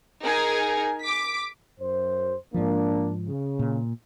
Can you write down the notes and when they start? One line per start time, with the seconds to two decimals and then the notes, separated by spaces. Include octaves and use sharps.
0.23 D#4 G#4 A#4 G#5
1.02 D6 B6
1.80 F#2 C5
2.54 G#2 F3 A#3 D4
3.28 C#3
3.59 A#2